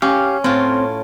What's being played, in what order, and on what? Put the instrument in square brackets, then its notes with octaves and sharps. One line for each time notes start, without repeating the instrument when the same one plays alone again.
[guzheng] C#4 [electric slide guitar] G4 F5
[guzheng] A2 F4 [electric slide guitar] C4